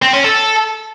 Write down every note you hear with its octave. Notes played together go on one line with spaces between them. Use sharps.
C4
C#4
A4